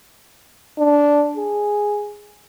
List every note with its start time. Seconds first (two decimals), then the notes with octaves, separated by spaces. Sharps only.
0.79 D4
1.37 G#4